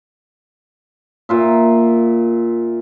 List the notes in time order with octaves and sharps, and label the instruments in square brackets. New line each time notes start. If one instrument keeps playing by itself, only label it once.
[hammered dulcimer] A#2 F4 E5